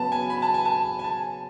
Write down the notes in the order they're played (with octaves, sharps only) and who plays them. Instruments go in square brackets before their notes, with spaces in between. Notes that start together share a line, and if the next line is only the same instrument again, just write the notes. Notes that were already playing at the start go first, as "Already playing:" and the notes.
Already playing: [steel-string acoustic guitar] C#3 F#3 B3 [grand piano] A5 B5
[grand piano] G#5
B5
A5
G#5
A5
G#5
A5